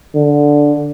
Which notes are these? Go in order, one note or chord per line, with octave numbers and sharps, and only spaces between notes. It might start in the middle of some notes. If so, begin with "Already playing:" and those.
D3